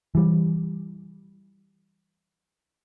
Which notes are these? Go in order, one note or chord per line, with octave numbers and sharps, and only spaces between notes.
E3 G3